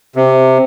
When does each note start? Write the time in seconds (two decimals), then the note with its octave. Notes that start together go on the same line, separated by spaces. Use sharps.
0.15 C3